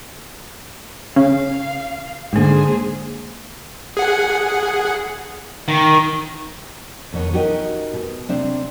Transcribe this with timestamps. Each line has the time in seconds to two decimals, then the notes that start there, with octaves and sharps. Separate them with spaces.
1.16 C#3 F5
2.33 G#2 D3 G#3 A#3 G#4 C5
3.97 G#4 F#5
5.68 D#3
7.13 F2 B2 D#3 C#5
7.33 C#4 D#4 F#4 G4 A#4 D#5
7.93 B2
8.28 C3 C4 D4 E5